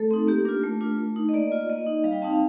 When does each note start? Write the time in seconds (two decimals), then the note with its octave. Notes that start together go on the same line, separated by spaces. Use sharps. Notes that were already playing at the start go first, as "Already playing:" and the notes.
Already playing: A3 A4
0.11 C4 D#4
0.27 A#3 G4
0.45 D4 F4 A#4
0.64 A3
0.81 D4 F4
0.98 A3
1.16 D#4
1.29 D#5
1.34 A#3 D5
1.52 F4
1.69 A#3 D#5
1.86 D#4
2.04 G3 F5
2.13 G5
2.22 C4 D#4 A5
2.30 F5